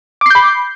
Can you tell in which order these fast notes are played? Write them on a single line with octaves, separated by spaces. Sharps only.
D6 C7 G6 B5